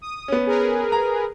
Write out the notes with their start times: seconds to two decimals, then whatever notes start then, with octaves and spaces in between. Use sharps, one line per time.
0.02 D#6
0.28 B3 C#4
0.47 G#4 A#4 B4
0.92 A#5